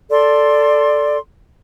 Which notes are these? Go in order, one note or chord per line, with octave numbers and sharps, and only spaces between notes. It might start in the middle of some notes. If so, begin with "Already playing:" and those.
A4 D5 C6